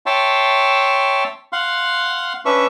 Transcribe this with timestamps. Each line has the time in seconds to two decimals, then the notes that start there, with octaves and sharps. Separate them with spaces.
0.06 C#5 E5 G5 A5 C6
1.53 F5 F#5 C6
2.45 C#4 D4 B4 E5 C#6